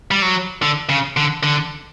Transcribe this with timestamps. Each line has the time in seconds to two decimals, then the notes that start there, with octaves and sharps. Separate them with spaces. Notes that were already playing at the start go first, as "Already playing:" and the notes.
0.11 G3
0.22 F#3
0.62 D3
0.89 C#3
1.17 D3
1.43 D3